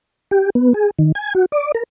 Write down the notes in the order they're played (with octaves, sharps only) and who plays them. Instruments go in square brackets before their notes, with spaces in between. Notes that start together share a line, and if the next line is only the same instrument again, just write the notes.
[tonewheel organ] G4
B3
G#4
D#3
G#5
F#4
D5
A#4